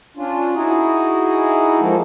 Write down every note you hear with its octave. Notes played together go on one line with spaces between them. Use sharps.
C#4 D4 F4
D#4 E4 F#4 G#4
F3 G#3 A#3 A4